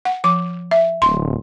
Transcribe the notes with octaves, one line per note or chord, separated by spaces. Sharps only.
F#5
F3 D6
E5
D1 C6